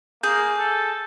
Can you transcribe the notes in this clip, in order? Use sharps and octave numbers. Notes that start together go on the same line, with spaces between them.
A#3 G#4 G6
A4